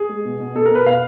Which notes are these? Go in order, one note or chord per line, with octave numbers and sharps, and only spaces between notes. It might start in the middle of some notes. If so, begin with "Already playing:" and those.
Already playing: G#4
G#3
B2
B2
B2 A4
A#4
B2 B4
B2 F5